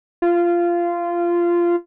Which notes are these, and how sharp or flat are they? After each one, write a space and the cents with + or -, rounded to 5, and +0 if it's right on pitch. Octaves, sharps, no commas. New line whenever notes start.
F4 -15